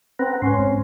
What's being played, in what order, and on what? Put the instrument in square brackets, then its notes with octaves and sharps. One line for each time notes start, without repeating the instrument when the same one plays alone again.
[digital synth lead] C4 [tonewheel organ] B4 F#5 A#5
[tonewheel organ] G#2 C6 [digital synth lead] C#4
[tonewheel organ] G#2 C4